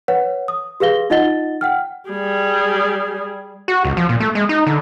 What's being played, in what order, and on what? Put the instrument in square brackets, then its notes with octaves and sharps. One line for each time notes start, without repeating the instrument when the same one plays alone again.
[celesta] B4 C#5 F#5
D#6
G4 G#4 B4 F5 A#6 G7
D#4 F4 D#5 F#5 A6 G7
F#5 G5 F6
[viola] G3 G#4
[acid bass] F#4
C#2
F3
A#2
A3
G#3
D#4
D3